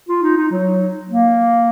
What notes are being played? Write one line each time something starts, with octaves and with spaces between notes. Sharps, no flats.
F4
D#4
D#4
F#3
A#3